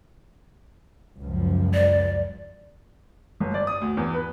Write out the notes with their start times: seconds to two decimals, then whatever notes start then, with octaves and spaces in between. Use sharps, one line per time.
1.20 C#2 F#2 F3
1.74 D5
3.40 G1
3.54 D5
3.67 D#6
3.81 D2
3.97 E2
4.14 B4